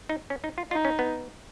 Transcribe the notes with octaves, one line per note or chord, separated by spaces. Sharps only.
D#4
C#4
D#4
F4
D#4 F4
C#4
B3